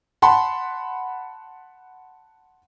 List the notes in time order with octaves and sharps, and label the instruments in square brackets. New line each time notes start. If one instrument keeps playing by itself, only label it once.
[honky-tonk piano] F#5 A5 B5 C6